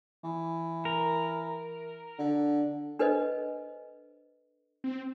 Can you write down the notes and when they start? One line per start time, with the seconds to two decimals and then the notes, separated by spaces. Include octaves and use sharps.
0.24 E3
0.85 A#4
2.19 D3
2.99 D4 A4 B4 C5 D#5
4.84 C4